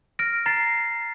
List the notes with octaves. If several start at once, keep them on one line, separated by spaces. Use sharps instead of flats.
F6 A#6 D7
A#5 A6 C7